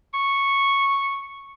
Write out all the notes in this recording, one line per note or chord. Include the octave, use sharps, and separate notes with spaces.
C#6